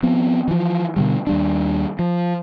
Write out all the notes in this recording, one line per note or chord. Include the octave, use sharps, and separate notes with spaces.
F3 B3 C4
E3 F3
B2 D3 G3
D#2 G3 D4
F3